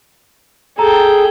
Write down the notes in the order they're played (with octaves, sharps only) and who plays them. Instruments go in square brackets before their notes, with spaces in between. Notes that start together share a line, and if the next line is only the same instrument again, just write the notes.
[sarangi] G#4 [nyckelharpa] A4 G5 [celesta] A#5